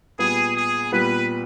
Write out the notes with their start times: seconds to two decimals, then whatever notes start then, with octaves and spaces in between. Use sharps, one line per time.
0.19 A#2 G3 B3 G#4
0.55 G#4
0.92 A#2 G3 B3 B4